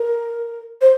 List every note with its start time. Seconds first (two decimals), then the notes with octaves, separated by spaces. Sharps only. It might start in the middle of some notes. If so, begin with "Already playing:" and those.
Already playing: A#4
0.81 C5